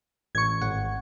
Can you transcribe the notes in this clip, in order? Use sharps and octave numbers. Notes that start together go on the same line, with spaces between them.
A1 C#6 G#6
G#1 F#5